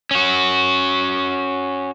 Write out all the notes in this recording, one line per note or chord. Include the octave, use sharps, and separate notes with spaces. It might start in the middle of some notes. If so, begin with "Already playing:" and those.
C#4 F#4